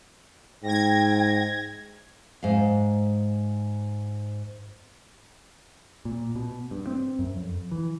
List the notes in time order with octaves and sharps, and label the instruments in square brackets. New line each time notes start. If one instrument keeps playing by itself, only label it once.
[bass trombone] G#2 [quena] G5 [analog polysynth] G#6 A#6
[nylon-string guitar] G#2 F5
[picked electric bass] A#2
B2
G2
C4
F#2
F2
E3